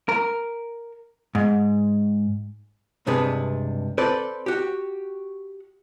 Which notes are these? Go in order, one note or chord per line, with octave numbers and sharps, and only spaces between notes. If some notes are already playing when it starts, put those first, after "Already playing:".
A#4
G#2
C#2 G2 C3 D4 G#4 B4
C4 A4 B4 C5 D5
F#4 G4